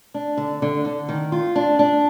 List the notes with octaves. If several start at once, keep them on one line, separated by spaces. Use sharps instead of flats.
D4
D3
D3
D3
D#3
F4
D4
D4